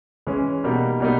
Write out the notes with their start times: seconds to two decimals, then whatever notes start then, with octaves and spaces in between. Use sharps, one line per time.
0.27 E3 G#3 C#4
0.64 B2 G3 A#3 D#4
1.00 B2 G3 A#3 D#4